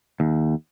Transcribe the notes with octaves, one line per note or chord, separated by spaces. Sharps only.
D#2